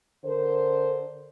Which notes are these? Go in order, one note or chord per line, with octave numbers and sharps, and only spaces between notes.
D3 A#4 C5